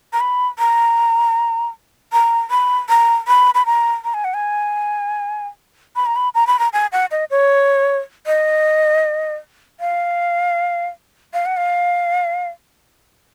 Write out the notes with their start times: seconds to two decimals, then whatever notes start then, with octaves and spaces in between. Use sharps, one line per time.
0.13 A#5
0.20 B5
0.59 A#5
2.13 A#5
2.51 B5
2.89 A#5
3.28 B5
3.55 B5
3.66 A#5
4.04 A#5
4.14 G#5
4.24 F#5
4.34 G#5
5.96 B5
6.06 A#5
6.16 B5
6.35 A#5
6.47 B5
6.59 A#5
6.73 G#5
6.92 F#5
7.11 D#5
7.31 C#5
8.27 D#5
9.80 F5
11.34 F5
11.46 F#5
11.57 F5